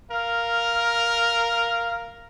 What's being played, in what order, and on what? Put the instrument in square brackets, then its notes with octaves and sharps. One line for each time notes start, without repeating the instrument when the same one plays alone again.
[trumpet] A#4 [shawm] F5